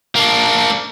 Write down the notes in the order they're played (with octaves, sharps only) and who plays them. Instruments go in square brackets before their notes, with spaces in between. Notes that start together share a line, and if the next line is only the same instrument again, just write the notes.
[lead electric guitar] A#3 D4